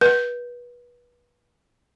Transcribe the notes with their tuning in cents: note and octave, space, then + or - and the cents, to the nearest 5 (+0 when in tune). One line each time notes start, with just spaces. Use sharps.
B4 -25